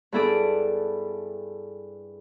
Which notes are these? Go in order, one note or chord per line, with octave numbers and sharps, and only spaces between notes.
G2 B3 E4 G#4 A4 D6